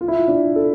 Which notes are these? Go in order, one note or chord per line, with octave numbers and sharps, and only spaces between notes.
F4
E4
F4
D4
A4